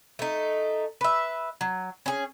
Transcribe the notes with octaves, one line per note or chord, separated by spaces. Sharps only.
A3 D#4
B4 E5
F#3
C#4 G#4